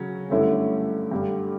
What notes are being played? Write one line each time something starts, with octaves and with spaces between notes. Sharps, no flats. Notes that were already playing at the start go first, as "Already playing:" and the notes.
Already playing: C#3 F#3 C#4
G2 D3 A3 C#4 E4
G2 D3 G3